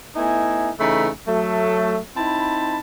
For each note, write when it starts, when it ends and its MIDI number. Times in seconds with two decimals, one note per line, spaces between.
0.16 0.70 57
0.16 0.70 59
0.16 0.70 63
0.16 0.70 64
0.16 0.70 80
0.79 1.08 49
0.79 1.08 52
0.79 1.08 57
0.79 1.08 63
0.79 1.08 82
0.79 1.08 83
1.26 1.98 54
1.26 1.98 57
2.16 2.78 60
2.16 2.78 63
2.16 2.78 64
2.16 2.78 81
2.16 2.78 83